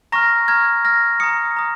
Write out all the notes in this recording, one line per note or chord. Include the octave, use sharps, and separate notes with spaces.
A#5 C#6 F6 A#6
A#5 F6 G#6
A#5 F6 A#6
A#5 D#6 C#7
A#5 D#6